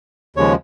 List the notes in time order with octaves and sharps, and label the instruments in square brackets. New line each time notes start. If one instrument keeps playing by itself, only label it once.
[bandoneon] D#2 C#3 F3 G#3 C#5